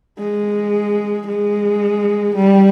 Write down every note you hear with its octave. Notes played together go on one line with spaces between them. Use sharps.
G#3
G#3
G3